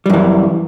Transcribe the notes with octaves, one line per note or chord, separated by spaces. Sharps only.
F#2 E3 G3